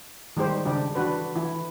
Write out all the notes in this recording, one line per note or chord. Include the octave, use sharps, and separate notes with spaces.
D#3 G3 G#3 G4 C5
C#3 D4 G4
E3 D4 F#4 B4
E3 E4